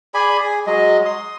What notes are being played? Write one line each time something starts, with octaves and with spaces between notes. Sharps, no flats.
G#4 D5 G#5 B5
G#4
F#3 G#3 D#5
C6 D#6